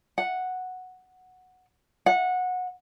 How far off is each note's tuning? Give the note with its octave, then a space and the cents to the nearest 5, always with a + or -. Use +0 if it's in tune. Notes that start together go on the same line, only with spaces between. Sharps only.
F#5 -5
F#5 -20